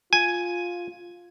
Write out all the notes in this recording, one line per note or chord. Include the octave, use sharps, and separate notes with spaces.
F4 G#5